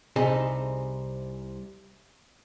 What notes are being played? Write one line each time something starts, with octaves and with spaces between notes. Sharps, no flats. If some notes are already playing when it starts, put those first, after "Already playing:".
C2 C3 D#4 G#4 A5